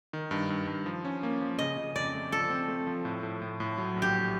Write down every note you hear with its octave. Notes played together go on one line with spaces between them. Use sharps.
D#3
G2
G2
G2
F3
C#4
A#3
F3
C#3 D#5
C#3
F2 D5
A3
F3 A4
C4
A3
F3
A2
A2
A2
A2
F#3
A#1
G4
A#1